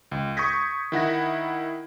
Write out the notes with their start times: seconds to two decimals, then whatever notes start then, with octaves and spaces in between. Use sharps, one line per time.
0.11 C#2
0.37 C#6 D#6 G6 G#6 A#6 B6
0.92 D#3 E4 F#5 A#6